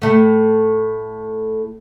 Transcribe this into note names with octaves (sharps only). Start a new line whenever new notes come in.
A2 A3